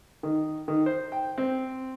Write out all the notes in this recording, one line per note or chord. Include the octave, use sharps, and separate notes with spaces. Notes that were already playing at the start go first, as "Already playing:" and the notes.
D#3
D#3
C5
G5
C4